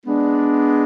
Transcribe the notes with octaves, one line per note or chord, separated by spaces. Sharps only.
G#3 B3 D4